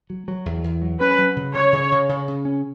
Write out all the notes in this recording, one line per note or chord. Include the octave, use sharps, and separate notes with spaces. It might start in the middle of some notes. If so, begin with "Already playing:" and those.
F#3
F#3
E2
E2
F#3
C#4 B4
F#3
C#3
C#3 C#5
C#3
C#3
C#3
C#3
C#4